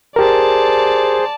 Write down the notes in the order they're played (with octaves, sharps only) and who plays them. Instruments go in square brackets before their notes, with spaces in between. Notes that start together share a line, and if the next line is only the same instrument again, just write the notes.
[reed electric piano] G4 A#4 [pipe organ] G#4 C5 [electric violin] D5 A5